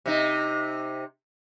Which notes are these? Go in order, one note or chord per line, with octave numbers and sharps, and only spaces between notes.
C3 D#4